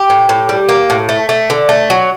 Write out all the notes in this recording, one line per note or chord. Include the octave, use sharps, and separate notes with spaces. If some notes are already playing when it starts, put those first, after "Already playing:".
Already playing: G4
A2
A2
G3
A#3
A2
A3
A3
D3
A3
F#3